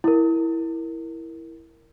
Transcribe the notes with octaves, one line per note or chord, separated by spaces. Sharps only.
E4 A#4